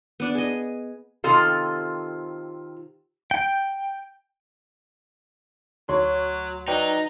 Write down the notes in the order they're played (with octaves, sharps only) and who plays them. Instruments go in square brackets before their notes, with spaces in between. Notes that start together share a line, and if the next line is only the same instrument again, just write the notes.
[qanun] B3 D4 D5
G#4 D#5
[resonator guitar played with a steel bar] C3 D#3 C4 F4 A4
[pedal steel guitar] G5
[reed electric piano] D2 C6 [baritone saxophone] F#3 [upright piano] C#5
[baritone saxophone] F#3 [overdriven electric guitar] D#4 [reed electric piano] B4 D5 G5